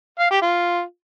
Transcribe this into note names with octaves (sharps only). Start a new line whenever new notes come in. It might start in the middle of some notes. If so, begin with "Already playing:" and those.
F5
G4
F4